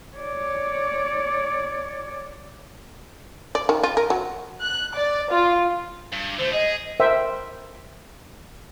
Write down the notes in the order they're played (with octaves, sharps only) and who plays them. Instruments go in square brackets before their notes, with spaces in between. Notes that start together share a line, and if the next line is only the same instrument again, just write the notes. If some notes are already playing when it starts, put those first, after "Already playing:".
[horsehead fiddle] C#5 D5
[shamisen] D5
D#3
F4
A#4
F#3
[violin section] F#6
D5
F4
[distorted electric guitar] G2
[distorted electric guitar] D3 A3 [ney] C5
[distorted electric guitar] G#4 [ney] D#5
[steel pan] A#4 C5 E5 G5